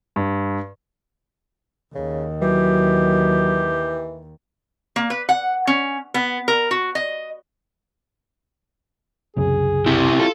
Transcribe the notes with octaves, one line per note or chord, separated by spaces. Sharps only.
G2
D#2 C#3
E3 F#3 G4
A#3
B4
F#5
C#4
B3
A#4
F#4
D#5
C2 F#2 C#3 G#4
C3 E4 G4
F4 A4